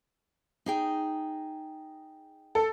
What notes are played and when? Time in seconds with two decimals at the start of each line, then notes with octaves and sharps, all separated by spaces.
0.66 D#4 G#4 G5
2.55 A4